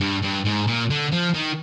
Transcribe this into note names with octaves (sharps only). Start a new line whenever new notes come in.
G2
G2
G#2
A#2
D3
F3
D#3